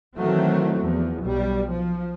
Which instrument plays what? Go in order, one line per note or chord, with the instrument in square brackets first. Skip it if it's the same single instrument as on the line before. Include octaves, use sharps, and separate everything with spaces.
[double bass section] D#3 E3 F#3 A3 C4
E2 F3
B1 G3
F3